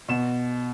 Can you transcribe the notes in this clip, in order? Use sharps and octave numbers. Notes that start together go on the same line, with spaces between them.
B2 E7